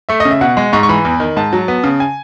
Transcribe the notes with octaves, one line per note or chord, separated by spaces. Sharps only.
A3 E5
D#5
C#3
E5
B2 F#5
G#3
G#2 C#6
C#6
E3 B5
E2
D#3
G#2 A5
F#3
B3
C#3
G#5